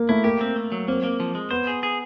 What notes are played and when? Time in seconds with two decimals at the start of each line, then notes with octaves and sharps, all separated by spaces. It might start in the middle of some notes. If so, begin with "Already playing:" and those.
Already playing: A#3
0.09 A3 E4
0.24 A#3 G4
0.41 C4
0.56 A3
0.72 F#3
0.88 A#3 C4
1.03 A#3
1.20 F3
1.35 G#3
1.51 B3 C5
1.67 G#4
1.83 G#4